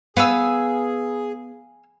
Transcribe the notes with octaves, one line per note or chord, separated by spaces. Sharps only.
B3 G#4 F5 G#5 E6